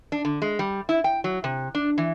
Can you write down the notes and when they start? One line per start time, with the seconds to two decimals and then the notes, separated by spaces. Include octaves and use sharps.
0.12 D4
0.25 D3
0.42 G#3
0.59 G3
0.89 E4
1.04 G5
1.24 F#3
1.44 C3
1.75 D4
1.98 E3